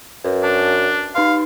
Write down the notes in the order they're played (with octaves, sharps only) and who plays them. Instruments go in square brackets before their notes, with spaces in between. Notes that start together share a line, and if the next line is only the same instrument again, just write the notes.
[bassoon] F#2 [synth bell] B4
[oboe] D4 [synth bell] A5
[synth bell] D#4 B4 C6 [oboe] F5